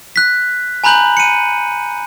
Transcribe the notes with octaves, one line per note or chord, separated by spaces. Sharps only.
F#6 B6
G#5 A#5 B5 F#6 G6 F#7
C#7 D#7